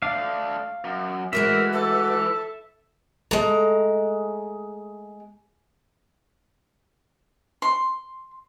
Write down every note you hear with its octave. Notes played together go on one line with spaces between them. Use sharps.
A3 D4 F5
F#2
E3 G#3 A3 F#4 A#4 E5
A4
G#3 A3 A4 A#5
C6